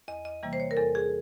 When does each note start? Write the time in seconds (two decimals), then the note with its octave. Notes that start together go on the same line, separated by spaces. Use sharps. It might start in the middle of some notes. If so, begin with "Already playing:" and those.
0.08 E2 D#5
0.25 D#5
0.43 C3 E3 G3 A#3
0.53 C5
0.60 C#5
0.71 A#4
0.77 E2 A4
0.95 G#4